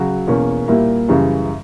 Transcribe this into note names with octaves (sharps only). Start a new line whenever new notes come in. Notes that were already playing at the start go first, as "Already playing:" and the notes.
Already playing: C#3 F#3 F#4
E2 B2 A#3 C#4
A#2 G3 A#3 E4
F#2 C#3 E3 G3